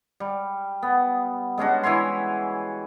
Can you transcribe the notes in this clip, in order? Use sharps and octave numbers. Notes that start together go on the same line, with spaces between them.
G3
B3
G#3 C#4 D4 F#4
E3 E4 C#5 C6